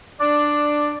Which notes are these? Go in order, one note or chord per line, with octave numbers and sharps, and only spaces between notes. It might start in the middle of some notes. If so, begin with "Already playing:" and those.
D4 D5